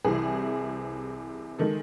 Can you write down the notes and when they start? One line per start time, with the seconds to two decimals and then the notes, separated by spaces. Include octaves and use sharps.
0.04 C2 C3 E3 C4 G#4
1.59 D#3 G#3 A4